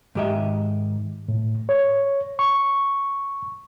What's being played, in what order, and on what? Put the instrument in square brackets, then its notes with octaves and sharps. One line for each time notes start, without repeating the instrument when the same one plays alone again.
[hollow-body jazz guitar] G#2 D#3 G4 D#5 E5
[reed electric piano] A2
C#5
C#6